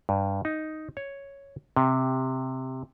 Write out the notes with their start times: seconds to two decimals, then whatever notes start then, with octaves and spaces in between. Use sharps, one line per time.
0.09 G2
0.45 D#4
0.97 C#5
1.76 C3